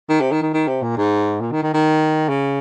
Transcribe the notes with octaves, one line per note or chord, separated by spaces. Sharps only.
D#3
C3
D#3
D#3
D#3
C3
A#2
G#2
A#2
D#3
D#3
D#3
C#3